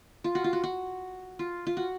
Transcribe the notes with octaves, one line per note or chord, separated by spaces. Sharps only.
F4
F#4
F4
F#4
F#4
F4
F4
F#4